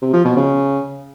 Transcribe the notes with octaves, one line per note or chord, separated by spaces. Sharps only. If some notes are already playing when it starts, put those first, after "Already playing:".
C3
F3
B2
C#3